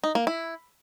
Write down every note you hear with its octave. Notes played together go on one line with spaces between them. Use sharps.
D#4
A#3
E4